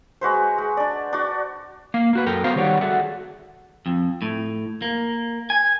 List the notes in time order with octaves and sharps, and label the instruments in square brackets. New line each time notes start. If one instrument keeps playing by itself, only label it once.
[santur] G#3 F#4 B4 C5
G#3
D4 D5
D4 F#4
[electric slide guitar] A#3 F5
A#3 F#4 B4
F#2 A4 A#4 G5
B3 F#4 A#4 C5 F5
D#3 G3 G4 C#5 D5 F#5
F#4 G#4 A4 D5 E5 F#5
[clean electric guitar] F2
A2
A#3
G#5